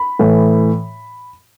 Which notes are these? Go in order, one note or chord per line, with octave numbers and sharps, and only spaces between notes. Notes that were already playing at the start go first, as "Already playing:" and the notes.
Already playing: B5
A2 E3